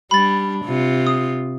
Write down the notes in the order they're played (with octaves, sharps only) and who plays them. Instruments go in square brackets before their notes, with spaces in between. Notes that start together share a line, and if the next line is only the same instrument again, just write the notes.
[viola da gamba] G3 D4 [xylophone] B5 A6
[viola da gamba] C3 F4
[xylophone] D#6